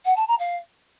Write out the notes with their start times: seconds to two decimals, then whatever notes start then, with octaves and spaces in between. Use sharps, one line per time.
0.05 F#5
0.16 A5
0.28 A#5
0.39 F5